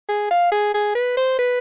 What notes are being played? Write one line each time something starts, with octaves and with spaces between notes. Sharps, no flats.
G#4
F5
G#4
G#4
B4
C5
B4